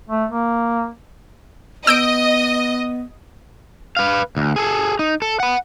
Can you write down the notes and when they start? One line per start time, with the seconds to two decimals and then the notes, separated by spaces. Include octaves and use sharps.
0.09 A3
0.31 A#3
1.87 B3 D#5 E6 G6 D7
3.97 B4 F5
4.37 D2
4.56 G#4 A4
4.99 D#4
5.22 A4
5.40 F#5 B5